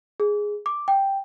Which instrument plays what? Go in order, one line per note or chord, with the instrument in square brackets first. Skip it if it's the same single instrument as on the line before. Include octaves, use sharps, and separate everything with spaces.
[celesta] G#4
D6
G5